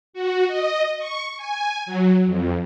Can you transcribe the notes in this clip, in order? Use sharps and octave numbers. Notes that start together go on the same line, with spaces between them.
F#4
D#5
C#6
G#5
F#3
F2